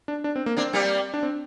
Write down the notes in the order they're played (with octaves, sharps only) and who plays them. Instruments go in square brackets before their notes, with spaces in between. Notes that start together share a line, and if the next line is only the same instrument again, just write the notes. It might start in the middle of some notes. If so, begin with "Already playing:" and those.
[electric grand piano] D4
D4
C4
A#3
[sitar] A#3 D4 [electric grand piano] C4
[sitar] G3 A#3
[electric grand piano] D4
C4